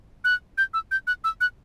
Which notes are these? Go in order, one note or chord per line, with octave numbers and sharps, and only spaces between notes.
F#6
G6
E6
G6
F#6
E6
F#6